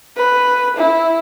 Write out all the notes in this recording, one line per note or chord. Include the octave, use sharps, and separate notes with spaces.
B4
E4